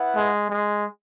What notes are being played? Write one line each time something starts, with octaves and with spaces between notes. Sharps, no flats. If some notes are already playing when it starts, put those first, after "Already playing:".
Already playing: B3 E4 B4 F#5
G#3
G#3